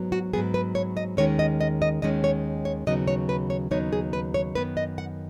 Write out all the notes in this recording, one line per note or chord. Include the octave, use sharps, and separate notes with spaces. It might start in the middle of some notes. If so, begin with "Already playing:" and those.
Already playing: G#2 F#3 B3
F#4
G#2 F#3 B3 G#4
B4
C#5
D#5
D#2 D#3 G#3 C#4 C#5
D#5
D#5
D#5
D#2 D#3 G#3 C#4 D#5
C#5
C#5
D#2 C#3 F#3 B3 D#4 D#5
C#5
B4
C#5
D#2 C#3 F#3 B3 D#4 C#5
G#4
B4
C#5
F#2 D#3 B3 B4
D#5
F#5